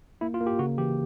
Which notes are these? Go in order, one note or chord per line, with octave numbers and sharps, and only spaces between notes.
A#3 E4
F4
A#3
G4
C#3 F#4
E3 G4